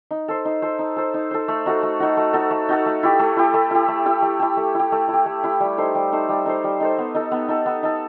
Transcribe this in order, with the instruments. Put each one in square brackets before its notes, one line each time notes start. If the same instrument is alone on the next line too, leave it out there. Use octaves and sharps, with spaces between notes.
[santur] D#4
A4 C5
D#4
A4 C5
D#4
A4 C5
D#4
A4 C5
A3
D#4 F#4 A4
A3
D#4 F#4 A4
A3
D#4 F#4 A4
A3
D#4 F#4 A4
A3
E4 G4
A3
E4 G4
A3
E4 G4
A3
E4 G4
A3
E4 G4
A3
E4 G4
A3
E4
G4
A3
E4 G4
G3
D#4 A4 C5
G3
D#4 A4 C5
G3
D#4 A4 C5
G3
D#4 A4 C5
B3
D#4 A4
B3
D#4 A4
B3
D#4 A4